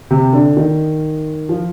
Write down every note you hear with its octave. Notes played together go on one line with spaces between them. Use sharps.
C3
D3
D#3
F3